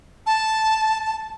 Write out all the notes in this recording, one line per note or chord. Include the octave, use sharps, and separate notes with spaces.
A5